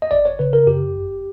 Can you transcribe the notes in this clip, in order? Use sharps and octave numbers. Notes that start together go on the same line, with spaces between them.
D#5
G1 D5
C#5
C#3 B4
A#4
F#2 G4
G1